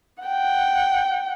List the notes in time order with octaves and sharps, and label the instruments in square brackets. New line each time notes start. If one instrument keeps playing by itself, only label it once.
[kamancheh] F#5 G5